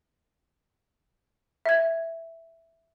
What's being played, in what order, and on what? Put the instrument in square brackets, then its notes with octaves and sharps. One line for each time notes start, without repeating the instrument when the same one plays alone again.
[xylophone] E5 G#6